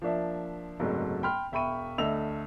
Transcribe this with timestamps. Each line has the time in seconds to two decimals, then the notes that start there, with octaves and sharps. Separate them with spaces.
0.02 F3 A#3 D4 E5
0.80 F#1 C2 G#2 F#3 A3 A4
1.23 G5 B5 C6 F6
1.52 E1 E5 G5 B5 C#6 D#7
1.98 D2 A3 D#5 E5 E6 F7